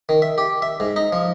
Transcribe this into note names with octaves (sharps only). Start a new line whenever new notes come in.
D#3
E5
G4
E5
G#2
D#4
F3